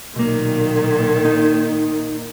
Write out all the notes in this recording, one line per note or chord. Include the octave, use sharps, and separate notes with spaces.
B1 A#2 D#3 A#3
D#4